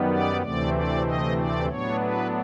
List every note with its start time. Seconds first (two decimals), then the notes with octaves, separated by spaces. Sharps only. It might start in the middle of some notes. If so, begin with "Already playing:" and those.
Already playing: F#2 D#3 G3 B3
0.10 D5
0.41 D2 C3 E3 A3 C4 D5
0.74 D5
1.05 D#5
1.37 D5
1.68 A2 F#3 B3 D4 C#5
2.00 B4